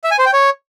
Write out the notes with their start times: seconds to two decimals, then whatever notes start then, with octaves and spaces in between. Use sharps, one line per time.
0.04 E5
0.11 G#5
0.19 C5
0.26 G5
0.33 C#5